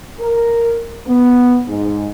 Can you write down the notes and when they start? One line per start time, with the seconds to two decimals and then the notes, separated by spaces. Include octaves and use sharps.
0.21 A#4
1.06 B3
1.67 G#2